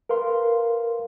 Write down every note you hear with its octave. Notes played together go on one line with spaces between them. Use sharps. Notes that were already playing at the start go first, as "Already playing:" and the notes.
A#4 B4 F5 C6